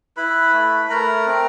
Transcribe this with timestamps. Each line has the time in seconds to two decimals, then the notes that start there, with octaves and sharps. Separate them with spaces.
0.17 E4 B4 B5
0.53 A3
0.90 A3 A#4 A#5
1.26 C4